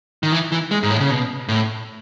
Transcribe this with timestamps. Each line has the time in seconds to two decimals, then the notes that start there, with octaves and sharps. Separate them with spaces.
0.23 D#3
0.32 E3
0.52 E3
0.71 G#3
0.83 G#2
0.90 A2
1.00 C#3
1.10 B2
1.48 A2